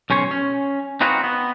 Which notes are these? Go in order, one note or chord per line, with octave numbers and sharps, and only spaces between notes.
B1 C#4 C5 C#5
C#4
C4 D#4 F4 F#4 B4 C#5
B3